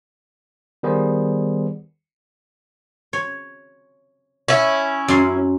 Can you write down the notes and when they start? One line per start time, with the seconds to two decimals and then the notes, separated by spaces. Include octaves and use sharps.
0.83 D#3 G3 B3 G#4 C5
3.13 C#5
4.48 C#4 E4
5.08 F#2 C6